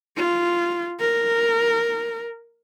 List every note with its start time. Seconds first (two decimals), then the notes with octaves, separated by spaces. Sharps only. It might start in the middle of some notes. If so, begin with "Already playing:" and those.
0.16 F4
1.00 A#4